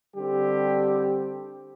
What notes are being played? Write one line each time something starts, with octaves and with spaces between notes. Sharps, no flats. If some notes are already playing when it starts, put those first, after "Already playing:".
D3 G3 C4 G4